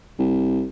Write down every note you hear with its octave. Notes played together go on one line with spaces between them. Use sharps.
C2